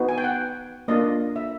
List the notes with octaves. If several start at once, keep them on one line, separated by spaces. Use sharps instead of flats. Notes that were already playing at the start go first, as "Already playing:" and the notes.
Already playing: B3 D#4 F#4
G#5
G5
F#5
A#3 D4 F4 D#5
E5